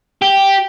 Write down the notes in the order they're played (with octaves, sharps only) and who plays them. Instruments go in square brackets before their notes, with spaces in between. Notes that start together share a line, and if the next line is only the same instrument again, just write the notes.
[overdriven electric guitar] G4